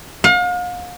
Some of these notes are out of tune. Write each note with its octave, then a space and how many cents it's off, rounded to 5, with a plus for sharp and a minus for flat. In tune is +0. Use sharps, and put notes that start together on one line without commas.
F5 +40